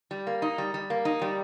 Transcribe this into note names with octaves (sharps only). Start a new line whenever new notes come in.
G3
A#3
D#4
G3
G3
A#3
D#4
G3